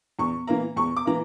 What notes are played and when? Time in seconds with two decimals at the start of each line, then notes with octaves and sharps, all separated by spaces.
0.19 E2 C#6
0.47 E3 A#3 A#5
0.76 E2 C#6
0.96 D6
1.05 E3 A#3 A#5